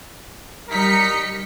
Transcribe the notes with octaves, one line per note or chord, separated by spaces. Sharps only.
G3 D#4 A#4 B6 C#7